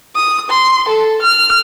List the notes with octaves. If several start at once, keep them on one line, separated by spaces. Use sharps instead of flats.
D#6
C6
A4
F6